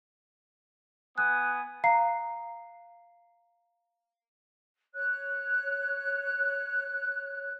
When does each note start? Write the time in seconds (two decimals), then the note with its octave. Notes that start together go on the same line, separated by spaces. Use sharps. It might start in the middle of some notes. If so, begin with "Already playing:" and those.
1.18 B3 G#5 D#6 F#6
1.84 F5 A#5 C7
4.94 C#5 F#6